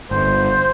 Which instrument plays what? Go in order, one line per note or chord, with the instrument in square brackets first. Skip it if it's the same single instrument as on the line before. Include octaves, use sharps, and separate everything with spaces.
[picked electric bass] G1 [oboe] C5